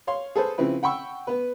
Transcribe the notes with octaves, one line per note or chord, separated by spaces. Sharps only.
C#5 F5 C6
G#4 A4 B4 C5
C#3 F3 C4 E4 B4
F#5 G5 B5 C#6 E6
B3 B4